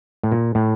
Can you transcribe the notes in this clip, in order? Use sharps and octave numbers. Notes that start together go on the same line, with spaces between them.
A2
A#2
A2